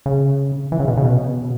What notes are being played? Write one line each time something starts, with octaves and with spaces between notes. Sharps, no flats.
C#3
E3
C#3
B2
C#3
B2